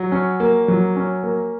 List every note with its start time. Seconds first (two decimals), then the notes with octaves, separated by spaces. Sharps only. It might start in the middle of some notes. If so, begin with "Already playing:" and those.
Already playing: F#3 F#5
0.12 C#4
0.40 A#3
0.68 F#3
0.96 C#4
1.23 A#3